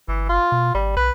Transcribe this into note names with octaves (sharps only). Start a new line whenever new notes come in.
G1 E3
F4
B2
G#1 G3
B1 B4